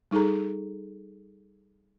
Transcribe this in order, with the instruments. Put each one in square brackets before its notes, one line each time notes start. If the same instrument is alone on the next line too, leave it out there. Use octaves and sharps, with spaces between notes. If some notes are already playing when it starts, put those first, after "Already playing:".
[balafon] G3 D#4 G#4 A4 A#5